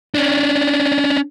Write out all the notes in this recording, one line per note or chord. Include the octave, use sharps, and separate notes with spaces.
C#4 D4